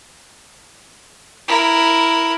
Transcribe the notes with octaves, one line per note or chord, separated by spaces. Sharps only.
E4 A#4